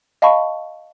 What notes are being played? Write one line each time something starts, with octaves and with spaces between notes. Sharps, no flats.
D#5 F5 A5 B5 C#6